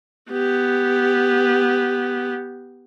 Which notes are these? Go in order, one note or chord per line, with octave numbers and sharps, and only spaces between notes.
B3 G4